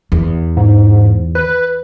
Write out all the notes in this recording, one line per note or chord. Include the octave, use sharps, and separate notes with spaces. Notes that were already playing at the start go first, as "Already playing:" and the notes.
E2
G#2
B4